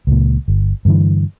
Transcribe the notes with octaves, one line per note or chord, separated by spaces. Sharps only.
C#2 A#2
G1
G2 D3 E3